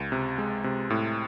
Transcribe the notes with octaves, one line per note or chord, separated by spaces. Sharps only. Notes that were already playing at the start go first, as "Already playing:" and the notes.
Already playing: C#2
C3
G#3
C3
A2